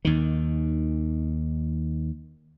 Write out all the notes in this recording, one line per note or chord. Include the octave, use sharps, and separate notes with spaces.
D#2 D#3